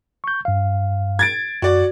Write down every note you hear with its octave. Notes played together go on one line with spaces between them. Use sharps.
C#6 G6
G2 F5
G#6 A6 D7
F#2 F#4 D5